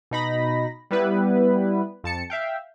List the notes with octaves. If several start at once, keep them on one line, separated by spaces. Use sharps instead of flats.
B2 D#4 B5 A#6
G3 B3 E4 B4
F2 A5 C#7
E5 F5 G5